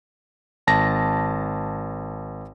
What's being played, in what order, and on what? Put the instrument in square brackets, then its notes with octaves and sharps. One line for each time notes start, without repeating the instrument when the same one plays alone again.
[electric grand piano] G#1 A5 A#6